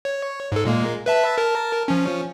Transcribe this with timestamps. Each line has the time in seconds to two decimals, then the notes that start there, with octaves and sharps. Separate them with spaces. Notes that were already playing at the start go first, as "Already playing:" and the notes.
0.05 C#5
0.52 G#2 A4
0.65 A#2 G#3 A#3
1.06 B4 E5 A5
1.38 A#4 A5
1.88 F3 C#4